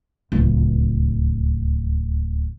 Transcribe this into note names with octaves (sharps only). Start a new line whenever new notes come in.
D1 C#2